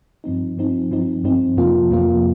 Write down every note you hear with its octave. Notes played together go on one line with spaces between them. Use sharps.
G2 F3 C4 D#4
G2 F3 C4 D#4
G2 F3 C4 D#4
G2 F3 C4 D#4
F2 C3 F3 A#3 F4
F2 C3 F3 A#3 F4